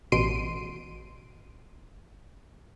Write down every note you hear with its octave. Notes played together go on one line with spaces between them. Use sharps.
A1 B2 C6 C7 D7 D#7